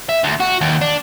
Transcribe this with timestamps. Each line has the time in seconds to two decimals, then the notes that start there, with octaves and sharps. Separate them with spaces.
0.09 E5
0.24 D2
0.40 F#4
0.61 D#2
0.82 D4